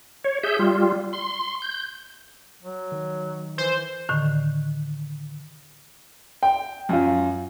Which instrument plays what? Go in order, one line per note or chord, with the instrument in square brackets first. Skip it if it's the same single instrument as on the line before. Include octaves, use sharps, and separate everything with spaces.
[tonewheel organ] C#5
G#4 E5 G6
G3 F4
C6
G6
[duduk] F#3
[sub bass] D#3
[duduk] E3 [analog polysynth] C5
[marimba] A2 D3 D#3
[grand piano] G5
F#2 F4